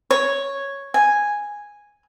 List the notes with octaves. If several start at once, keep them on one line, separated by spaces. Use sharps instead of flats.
C#5
G#5